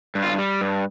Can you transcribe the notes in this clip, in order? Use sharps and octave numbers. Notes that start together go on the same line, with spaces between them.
G2
F4
G3
G2